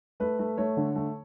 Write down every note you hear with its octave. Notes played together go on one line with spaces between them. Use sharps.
A3 B4
A3
A3 C#5
D3
A3